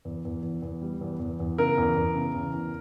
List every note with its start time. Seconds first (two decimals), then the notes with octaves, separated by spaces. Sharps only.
0.05 E2
0.25 E2
0.43 E2
0.62 E2
0.82 G3
1.01 E2
1.20 E2
1.40 E2
1.58 C#3 A#4
1.78 E2
1.96 E2
2.15 C#3
2.34 E2
2.54 E2